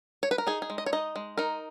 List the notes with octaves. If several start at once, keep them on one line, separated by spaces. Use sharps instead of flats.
C#5
B4
A#4
D#4 G#4
G#4
G#3
D#5
C#5
D#4 D#5
G#3
D#4 A#4